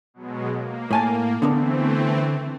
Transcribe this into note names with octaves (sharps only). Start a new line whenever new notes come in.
B2 F#3 G#3
A#3
A2 G#5 A5
D3 E3 A3 B3 C4 D4